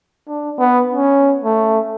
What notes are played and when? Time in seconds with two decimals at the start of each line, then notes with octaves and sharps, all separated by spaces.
0.28 D4
0.58 B3
0.93 C#4
1.45 A3